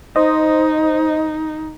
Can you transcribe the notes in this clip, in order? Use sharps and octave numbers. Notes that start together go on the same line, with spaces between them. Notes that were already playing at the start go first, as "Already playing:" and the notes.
D#4 C5 D#5